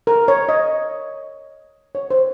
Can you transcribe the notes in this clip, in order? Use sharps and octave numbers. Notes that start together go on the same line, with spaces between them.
A#4
C#5
D#5
C#5
C5